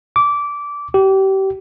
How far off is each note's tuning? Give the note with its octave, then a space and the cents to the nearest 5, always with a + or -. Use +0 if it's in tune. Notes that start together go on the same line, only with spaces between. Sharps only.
D6 -15
G4 -30